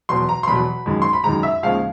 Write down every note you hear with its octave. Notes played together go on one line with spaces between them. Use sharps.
E2 B2 F#3 C6
A#5
C6
E2 B2 F#3 B5
F#2 D#3 G#3
C6
B5
F#2 D#3 G#3 A#5
E5
D#2 C#3 F3 G#3 F5